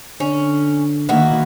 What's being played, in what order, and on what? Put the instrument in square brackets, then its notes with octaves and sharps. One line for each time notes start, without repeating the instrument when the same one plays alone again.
[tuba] D3 [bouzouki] C#4
[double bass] D#3 A#3 [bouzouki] B3 E4 F#4